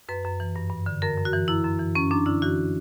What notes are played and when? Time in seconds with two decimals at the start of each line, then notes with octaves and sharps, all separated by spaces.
0.09 F#2 B4
0.25 F#2
0.40 E3
0.56 G2
0.70 G2
0.86 D3
1.02 F#2 A#4
1.18 F#2
1.25 F#4
1.33 E3
1.48 F#2 E4
1.64 F#2
1.79 E3
1.95 F#2 C#4
2.11 F#2 D4
2.26 D3 E4
2.42 E3 F#4